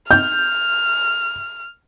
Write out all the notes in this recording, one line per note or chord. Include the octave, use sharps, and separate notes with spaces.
F6 G6